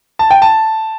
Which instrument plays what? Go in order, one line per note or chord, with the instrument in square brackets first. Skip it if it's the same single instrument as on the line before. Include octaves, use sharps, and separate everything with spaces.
[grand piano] A5
G5
A5